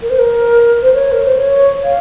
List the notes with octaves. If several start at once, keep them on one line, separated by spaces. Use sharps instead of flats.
A#4
C5
A#4
C5
C#5
A#4
C5
C#5
F5